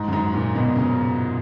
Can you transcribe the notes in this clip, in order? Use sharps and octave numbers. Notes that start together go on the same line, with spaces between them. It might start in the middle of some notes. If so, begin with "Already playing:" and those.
Already playing: G#2
F#2
G#2
A#2
B2
C#3